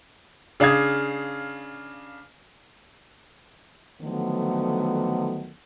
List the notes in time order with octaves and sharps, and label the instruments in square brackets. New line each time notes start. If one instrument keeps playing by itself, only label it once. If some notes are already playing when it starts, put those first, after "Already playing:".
[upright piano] C#3 D4 F5 D#6 G#6
[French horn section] D3 D#3 F3 F#3 A3 B3